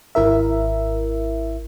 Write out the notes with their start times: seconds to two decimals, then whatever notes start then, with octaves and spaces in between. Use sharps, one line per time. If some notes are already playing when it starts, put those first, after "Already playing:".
0.15 G#1 E4 A#4 E5